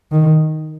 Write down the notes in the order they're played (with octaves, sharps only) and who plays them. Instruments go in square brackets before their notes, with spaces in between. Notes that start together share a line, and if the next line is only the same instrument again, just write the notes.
[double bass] D#3